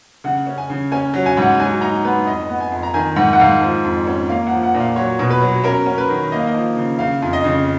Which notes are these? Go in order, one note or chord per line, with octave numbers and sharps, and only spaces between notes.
C#3 F#5
C#4
G#5
C#3
C#4 G#5
F#3
G#5
G#2 F#5
F#3 G#5
D#4 A#5
B3 B4
F2 D#5
B3
G#5
F2
A#5
D#3 G#5
G#2 F#5
F#5
G#2 F5
F3
F2
C#4
A#3 F5
F#5
F3
F#5
A#2
F5
F#3 C#5
B2
B4
F#3
C#4 A#4
C#4
B4
D#3
A#3 D#5
F5
D#5
F3
C#3
C#3 F5
F2
D#5
C#3